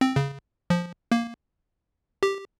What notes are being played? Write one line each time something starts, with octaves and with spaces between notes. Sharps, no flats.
C4
C#3
F3
A#3
G4